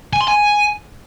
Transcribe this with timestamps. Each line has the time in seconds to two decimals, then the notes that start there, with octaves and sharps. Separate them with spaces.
0.13 G#5
0.21 C6
0.28 G#5